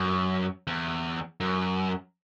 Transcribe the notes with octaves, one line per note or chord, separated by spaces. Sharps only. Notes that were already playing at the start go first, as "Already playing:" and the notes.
Already playing: F#2
E2
F#2